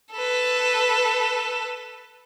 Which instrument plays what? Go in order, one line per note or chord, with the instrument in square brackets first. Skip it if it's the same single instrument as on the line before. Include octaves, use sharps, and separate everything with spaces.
[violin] A4 B4